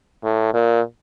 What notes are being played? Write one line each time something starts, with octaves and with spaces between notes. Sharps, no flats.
A2
A#2